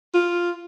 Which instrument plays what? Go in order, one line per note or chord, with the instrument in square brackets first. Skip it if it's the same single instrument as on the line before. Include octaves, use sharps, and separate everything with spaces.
[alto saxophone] F4